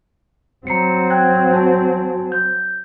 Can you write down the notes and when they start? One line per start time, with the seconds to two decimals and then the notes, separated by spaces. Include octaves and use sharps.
0.67 F#3 C4 A#5 C7 C#7
1.10 G5 F#6 G#6
1.53 F#4 G#5 A5
2.32 G6